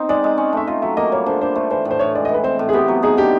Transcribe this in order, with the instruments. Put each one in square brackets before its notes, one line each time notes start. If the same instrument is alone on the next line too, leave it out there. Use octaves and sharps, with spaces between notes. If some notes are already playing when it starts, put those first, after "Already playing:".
Already playing: [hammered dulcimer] C4 D#4
[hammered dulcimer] G#3 [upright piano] D5
[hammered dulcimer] G#3
C#4
[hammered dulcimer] A3 [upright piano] E5
[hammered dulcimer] F4 [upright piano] D#5
[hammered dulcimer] F#3 [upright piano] E5
[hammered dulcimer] A#3 [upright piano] D#5
[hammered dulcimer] G3 [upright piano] C#5
[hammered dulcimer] D3 [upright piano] C5
[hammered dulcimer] D3 [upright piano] C5
[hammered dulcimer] A3 [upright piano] C5
[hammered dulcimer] E3 [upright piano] C5
[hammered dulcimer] A2
[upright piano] C5
[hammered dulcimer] A2 [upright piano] C#5
[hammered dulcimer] G#3 [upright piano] D5
[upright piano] D#5
[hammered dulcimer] E3
[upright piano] B4
[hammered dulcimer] C4 [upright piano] C5
[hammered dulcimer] A2
[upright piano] G#4
[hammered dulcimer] B3 [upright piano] G4
[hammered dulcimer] F#3
[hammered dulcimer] D#4 [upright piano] G#4
[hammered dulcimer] D3 [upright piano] G4